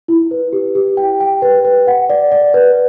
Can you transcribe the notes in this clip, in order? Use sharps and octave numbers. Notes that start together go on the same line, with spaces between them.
E4
B4
G4
G4
G5
G5
B4
B4
F#5
D5
D5
B4